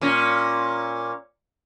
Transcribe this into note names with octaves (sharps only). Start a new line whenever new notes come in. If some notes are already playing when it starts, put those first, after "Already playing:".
A#2 C#4